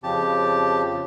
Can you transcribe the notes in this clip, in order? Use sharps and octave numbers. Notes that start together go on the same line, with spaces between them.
F2 C#3 G4 A5